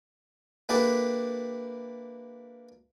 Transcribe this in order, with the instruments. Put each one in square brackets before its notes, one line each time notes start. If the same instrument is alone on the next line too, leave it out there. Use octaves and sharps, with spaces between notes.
[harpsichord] A#3 D4 E4 G4 A4 B4